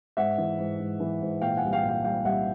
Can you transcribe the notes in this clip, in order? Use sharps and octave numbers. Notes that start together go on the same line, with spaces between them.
G#2 E5 F#5
E3
G#2
G#2
E3
G#2
A#2 F5 G5
F#5 G#5
C2
F5 G5
A#2
F5 G5
G3 F5 G5
C2 E5 F#5